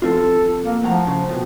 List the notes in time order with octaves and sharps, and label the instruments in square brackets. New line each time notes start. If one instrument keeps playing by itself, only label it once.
[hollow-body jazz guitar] F3 C4 F4 [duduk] A4
[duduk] A#3
[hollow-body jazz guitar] A2 F#5 A#5 [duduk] F3
[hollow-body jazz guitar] C#3
F2 B2